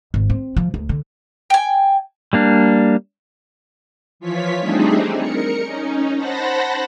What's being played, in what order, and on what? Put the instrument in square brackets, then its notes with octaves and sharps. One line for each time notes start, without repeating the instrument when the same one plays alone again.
[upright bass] G#1
C4
F3
D2
D3
[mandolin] G5 G#5
[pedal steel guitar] G3 A#3 D4
[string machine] E3 F3 F4 C#5 B6
G3 A3 C4 D4 D#4 G#4
A#4 C#7
C#4 D#4
C5 F#5 A5 B5 A#6